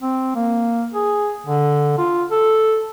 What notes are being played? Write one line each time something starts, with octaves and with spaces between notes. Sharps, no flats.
C4
A#3
G#4
D3
F4
A4